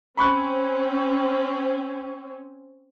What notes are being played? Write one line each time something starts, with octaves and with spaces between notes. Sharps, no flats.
C4 C#4 B5 C#6 F#6